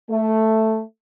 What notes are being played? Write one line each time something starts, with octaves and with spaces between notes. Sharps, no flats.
A3